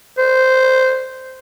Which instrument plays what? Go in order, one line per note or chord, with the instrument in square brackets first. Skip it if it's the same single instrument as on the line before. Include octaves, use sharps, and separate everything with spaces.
[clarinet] C5